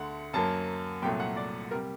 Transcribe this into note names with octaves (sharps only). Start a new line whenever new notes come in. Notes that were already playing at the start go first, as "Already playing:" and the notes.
Already playing: D2 D3 A3 F#5
F#2 F#3 A#3 A5
C2 A#2 F#3 A3 G5
F#5
D5
C3 G3 A#4